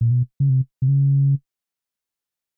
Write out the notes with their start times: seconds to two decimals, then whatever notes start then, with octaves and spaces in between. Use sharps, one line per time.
0.01 A#2
0.11 B2
0.40 C#3
0.50 C3
0.82 C3
0.88 C#3